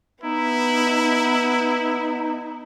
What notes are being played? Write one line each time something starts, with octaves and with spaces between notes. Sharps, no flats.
B3 D#4 E4